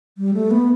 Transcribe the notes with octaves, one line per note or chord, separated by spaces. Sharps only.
G3
A3
B3